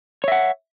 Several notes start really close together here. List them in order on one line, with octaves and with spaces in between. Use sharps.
C#5 E5 F#5